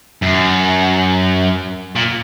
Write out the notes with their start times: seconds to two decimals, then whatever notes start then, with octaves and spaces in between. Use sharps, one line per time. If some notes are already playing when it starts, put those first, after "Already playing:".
0.22 F#2
1.95 A#2